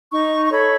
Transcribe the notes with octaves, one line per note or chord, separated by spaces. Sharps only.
D#4 C#6
C#6
A4 C#5 B5